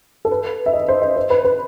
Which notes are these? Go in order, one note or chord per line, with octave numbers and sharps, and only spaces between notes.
A4
B4
E5
D#5
C5
D#5
C5
B4
B4